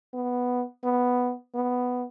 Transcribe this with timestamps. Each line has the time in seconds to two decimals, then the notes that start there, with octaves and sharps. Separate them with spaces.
0.14 B3
0.84 B3
1.55 B3